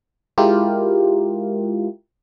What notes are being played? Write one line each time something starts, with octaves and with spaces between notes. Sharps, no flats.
G#3 E4 F4 G4 A#4